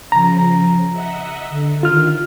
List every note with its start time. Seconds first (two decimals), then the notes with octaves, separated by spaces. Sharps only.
0.12 C#3 F3 A#5
0.92 D#5 E5 F#5
1.49 D3
1.83 D#3 F4 F6